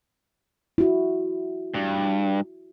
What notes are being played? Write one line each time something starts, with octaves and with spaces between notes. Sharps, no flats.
E4 F#4
G2